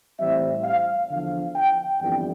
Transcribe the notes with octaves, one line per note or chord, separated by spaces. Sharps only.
A2 E3 G3 C4 E5
F5
E2 D3 F3 F5
G5
G1 F2 E3 G3 B3 G5